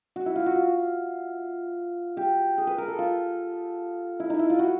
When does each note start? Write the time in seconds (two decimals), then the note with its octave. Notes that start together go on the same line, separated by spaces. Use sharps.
0.16 F#4
0.26 E4
0.36 F4
0.46 F#4
0.55 F4
2.17 G4
2.58 G#4
2.67 B4
2.78 A#4
2.88 A4
2.99 F4
4.20 E4
4.30 D#4
4.39 E4
4.50 F4
4.59 F#4